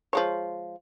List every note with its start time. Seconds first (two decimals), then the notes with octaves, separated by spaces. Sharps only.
0.13 F3 G#3 C#5